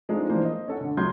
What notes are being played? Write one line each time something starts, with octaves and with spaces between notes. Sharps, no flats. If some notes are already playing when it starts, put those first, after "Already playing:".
F3 G#3 C4 D4 D#4 A4
E3 G#3 A#3 D4 C5 D5
D#5
C#4 A4 F#5
D3
C#2 F#3 F#4 C6 G6 G#6